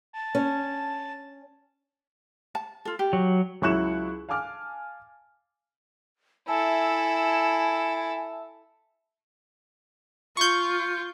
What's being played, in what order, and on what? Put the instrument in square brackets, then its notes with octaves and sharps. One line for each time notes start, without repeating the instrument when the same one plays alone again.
[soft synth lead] A5
[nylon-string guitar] C#4
[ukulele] A5
F4 A4
G4
[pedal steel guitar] F#3
[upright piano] C#2 F#3 E4 C#6 F#6 E7
F5 G#5 A5 D6 F6
[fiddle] E4 A4 [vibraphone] E5 A5 E6 [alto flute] G#5
[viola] F4 [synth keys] C#6 G6